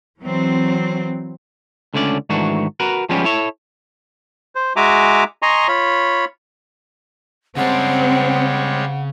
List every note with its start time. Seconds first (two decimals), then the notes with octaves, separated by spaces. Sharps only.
0.21 E3 F#3 C4
1.94 C#2 D3 A3 C#4 D5
2.30 G#2 D#3 E3 A3 D4 F#4
2.80 F#4 A#4 B4
3.09 F3 G3 G#3 B3 C#4 G4
3.24 E4 A4 C#5
4.55 C5
4.76 G#3 F#4 E5 G#5 A#5 D6
5.42 D#5 G#5 A#5 C6 C#6
5.68 F4 C#5 B5
7.57 C#3 G3 G#3 C4 C#5 F#5 A5